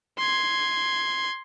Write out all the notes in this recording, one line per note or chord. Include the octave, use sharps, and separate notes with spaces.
C6 G#6